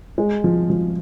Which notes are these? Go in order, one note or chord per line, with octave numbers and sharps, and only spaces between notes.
G#3
F3
F3